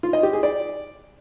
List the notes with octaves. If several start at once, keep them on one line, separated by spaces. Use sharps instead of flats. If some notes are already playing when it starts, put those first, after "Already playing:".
F4
D#5
G4
G#4
D5